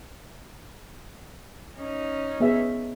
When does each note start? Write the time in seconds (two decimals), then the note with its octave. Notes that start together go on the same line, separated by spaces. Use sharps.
1.77 C#4 D#4
2.40 B3 G#4 E5